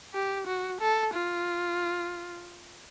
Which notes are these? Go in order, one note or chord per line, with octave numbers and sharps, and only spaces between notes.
G4
F#4
A4
F4